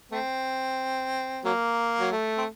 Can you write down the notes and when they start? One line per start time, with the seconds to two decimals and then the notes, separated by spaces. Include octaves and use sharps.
0.12 A3 C4
1.45 F#3 A#3
2.00 F#3
2.11 A3
2.38 C4